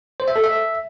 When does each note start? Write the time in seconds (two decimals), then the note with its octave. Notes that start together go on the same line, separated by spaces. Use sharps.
0.20 C5
0.28 E5
0.36 A4
0.44 E5